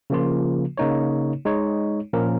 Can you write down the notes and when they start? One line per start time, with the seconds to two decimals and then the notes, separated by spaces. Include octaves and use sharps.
0.10 C#3 F3 A#3 F4
0.77 C#3 A#3 D#4 C#5
1.45 G#3 D#4 C#5
2.13 A#2 F3 A#3 C#4 A#4